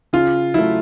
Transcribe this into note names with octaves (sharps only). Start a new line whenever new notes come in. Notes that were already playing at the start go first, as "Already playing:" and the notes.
C#3 F4
F#3 A3 E4